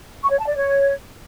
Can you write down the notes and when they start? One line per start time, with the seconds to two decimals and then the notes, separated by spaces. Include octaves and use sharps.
0.21 C#6
0.30 C#5
0.39 A5
0.47 D5
0.56 C#5